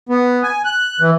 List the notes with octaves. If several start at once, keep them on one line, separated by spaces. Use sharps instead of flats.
B3
G#5
F#6
E3